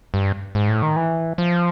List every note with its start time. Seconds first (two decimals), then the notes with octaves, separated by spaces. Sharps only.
0.14 G2
0.55 G#2
0.69 A2
0.82 D#3
0.96 E3
1.38 F3